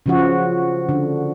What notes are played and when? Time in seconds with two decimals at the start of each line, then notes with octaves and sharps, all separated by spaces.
0.06 C#3 F3 F#4
0.89 D3